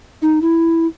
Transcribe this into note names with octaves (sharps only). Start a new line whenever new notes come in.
D#4
E4